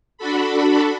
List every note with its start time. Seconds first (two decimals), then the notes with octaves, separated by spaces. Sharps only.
0.18 D4 F#4 A4 B5